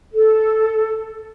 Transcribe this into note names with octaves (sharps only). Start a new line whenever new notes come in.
A4